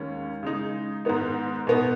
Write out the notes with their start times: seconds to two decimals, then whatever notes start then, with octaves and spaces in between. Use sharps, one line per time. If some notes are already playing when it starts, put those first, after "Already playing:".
Already playing: D#2 D#3 G#3 C#4
0.43 C#3 G#3 D#4
1.05 G#2 D#3 B3 D#4
1.67 B2 B3 D#4